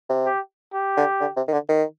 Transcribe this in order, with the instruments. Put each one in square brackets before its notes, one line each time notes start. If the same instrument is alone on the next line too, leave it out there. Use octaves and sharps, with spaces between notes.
[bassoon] C3
[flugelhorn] G4
G4
[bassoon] D3
D3
C3
D#3
D3
D#3